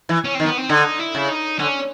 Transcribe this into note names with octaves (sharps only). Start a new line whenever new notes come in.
E3
C#4
D#3 C4
B3
C4
D3 D#4
E4
C#3
D#4
D3 C#4